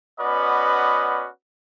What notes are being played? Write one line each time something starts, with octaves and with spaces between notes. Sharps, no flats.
B3 C#4 F#4 B4 D5 D#5